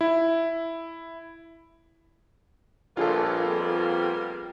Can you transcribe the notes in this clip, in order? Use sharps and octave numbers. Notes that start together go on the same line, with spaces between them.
E4
A#1 G3 A#3 B3 F4 G#4 A4
F2